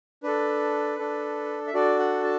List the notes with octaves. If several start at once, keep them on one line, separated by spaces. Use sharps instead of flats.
D4 A4 B4
D4 A4
E5
D4 F#4 A4 D5
F#5
A5